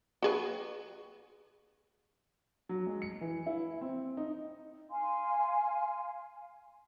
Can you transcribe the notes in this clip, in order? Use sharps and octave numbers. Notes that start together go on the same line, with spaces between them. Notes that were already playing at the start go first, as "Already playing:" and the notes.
F#4 G#4 B4
F#3
G#3
C#7
E3
E4
C4
D#4
F5 G#5 C6